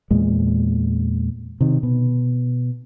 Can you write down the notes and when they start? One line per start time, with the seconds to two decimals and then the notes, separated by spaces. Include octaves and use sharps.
0.11 E2 A#2 G#3
1.61 C3 D#3
1.83 B2